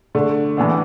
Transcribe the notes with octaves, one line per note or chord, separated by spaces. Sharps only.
D3 A3 D4
A2 E3 B3 D4